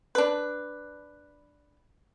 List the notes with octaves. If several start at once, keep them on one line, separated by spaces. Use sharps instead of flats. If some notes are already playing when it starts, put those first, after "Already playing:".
D4 B4